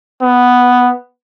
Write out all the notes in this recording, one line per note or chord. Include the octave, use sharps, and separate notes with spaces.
B3